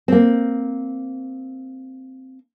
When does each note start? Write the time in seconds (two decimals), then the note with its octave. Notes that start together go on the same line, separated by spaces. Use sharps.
0.08 A#3 C4